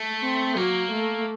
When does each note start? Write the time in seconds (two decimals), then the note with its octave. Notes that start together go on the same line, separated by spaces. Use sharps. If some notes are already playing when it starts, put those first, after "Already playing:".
Already playing: A3
0.22 C4
0.56 F#3 A#3
0.91 A3